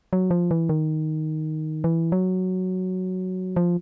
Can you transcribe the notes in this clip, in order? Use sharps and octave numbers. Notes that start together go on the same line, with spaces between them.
F#3
F3
E3
D#3
E3
F#3
F3